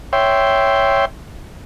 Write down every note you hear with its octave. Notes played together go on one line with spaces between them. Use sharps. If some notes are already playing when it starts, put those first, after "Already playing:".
C#5 E5 G5 C6